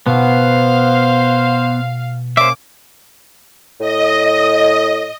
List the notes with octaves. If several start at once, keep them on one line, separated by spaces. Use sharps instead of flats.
B2 B3 C5 F5
A#3 C#4 C5 E5 D6
A2 D#5